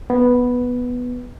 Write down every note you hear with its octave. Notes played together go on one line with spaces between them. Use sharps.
B3